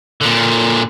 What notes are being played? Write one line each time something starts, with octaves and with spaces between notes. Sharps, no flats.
A#2 D3